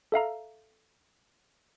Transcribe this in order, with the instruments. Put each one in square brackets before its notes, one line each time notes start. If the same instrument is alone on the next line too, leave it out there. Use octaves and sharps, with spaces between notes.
[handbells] A4 E5 F5 A#5